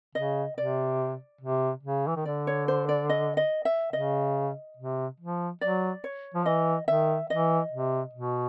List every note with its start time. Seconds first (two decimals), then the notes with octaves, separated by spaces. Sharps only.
0.15 C#3 D#5
0.57 C3 D5
1.41 C3
1.83 C#3
2.08 E3
2.16 D#3
2.25 D3 D5
2.47 C#5
2.68 C5
2.89 D5
3.10 D#5
3.37 D#5
3.65 E5
3.93 C#3 D#5
4.77 C3
5.20 F3
5.61 F#3 D5
6.04 C#5
6.35 F3
6.46 E3 D#5
6.88 D#3 E5
7.30 E3 D#5
7.72 C3
8.14 B2